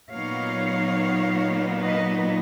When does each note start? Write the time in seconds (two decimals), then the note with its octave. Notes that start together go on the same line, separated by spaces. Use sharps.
0.13 A#2 F#3 B3 D#4 C#5 F5
1.81 B4 D#5